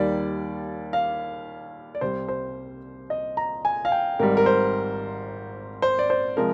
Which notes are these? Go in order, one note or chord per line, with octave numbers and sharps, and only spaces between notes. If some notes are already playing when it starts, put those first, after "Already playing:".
Already playing: D#2 D#3 G3 D5
F5
D5
C2 C3 G3 C5
C5
D#5
A#5
G#5
F5
G5
G#1 G#2 G3 A#4
A#4
C5
C5
D5
C5
C3 F3 G#3 A#4